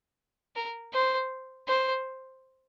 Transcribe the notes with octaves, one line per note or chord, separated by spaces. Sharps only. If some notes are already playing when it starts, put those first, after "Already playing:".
A#4
C5
C5